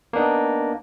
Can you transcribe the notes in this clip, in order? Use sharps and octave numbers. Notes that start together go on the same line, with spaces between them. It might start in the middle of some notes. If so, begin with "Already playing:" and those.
A#3 B3 D4 D#4